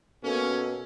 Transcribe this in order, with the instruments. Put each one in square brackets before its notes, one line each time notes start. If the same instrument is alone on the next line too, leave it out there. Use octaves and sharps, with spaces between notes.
[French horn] B2 [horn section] A#3 C#4 [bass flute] A4